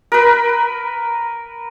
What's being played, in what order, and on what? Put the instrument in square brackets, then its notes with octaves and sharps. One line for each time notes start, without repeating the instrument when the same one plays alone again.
[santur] A#4 B4